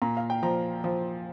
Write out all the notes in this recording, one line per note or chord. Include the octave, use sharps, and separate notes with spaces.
A#2 A#5
F5
G5
F3 A#5
F3